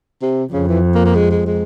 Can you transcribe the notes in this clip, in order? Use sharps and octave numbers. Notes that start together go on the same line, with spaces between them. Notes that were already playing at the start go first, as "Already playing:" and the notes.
C3
F2 C#3
E3
A#3
A#3
G#3
G#3
G#3